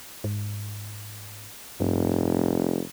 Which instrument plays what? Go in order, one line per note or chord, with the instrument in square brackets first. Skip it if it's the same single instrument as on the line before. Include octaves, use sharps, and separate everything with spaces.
[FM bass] G#2
[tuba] F1 [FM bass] G2